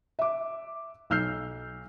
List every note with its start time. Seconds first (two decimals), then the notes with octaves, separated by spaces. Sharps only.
0.19 E5 D6
1.10 B1 E6 F6 G6 C7